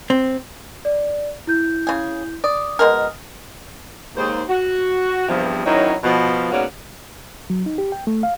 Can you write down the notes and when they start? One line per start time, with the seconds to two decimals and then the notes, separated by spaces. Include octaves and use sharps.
0.10 C4
0.85 D5
1.47 E4 G6
1.87 C#3 G#4
2.44 D5 D#6
2.79 B2 G#3 A#4
4.17 D#2 G#2 C5
4.49 F#4
5.29 E2 G2 C3 F3
5.66 D#3 F#3 C4 C#4 D#4 E4
6.04 B2 F3
6.52 G#2 B2 A#3 C#4 F#4 D5
7.50 F#3
7.66 D#4
7.78 G4
7.92 G5
8.07 A3
8.23 F5